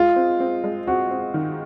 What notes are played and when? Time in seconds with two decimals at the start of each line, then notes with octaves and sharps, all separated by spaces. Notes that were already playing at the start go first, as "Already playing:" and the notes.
Already playing: G#3 F4
0.16 C4
0.40 C4
0.64 G#3
0.87 C4 F#4
1.11 C4
1.34 D#3